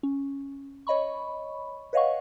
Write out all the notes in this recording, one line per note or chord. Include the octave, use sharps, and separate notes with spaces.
C#4
C#5 D#5 B5 C#6
B4 C#5 D#5 F5 F#5 C#6